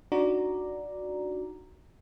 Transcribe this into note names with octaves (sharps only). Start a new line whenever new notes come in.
D4 D#4 F#4 D5 A#5